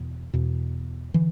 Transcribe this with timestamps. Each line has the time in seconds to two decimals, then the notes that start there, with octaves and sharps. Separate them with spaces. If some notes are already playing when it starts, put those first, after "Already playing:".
Already playing: E2 B2
0.34 E2 B2
1.14 D3 E3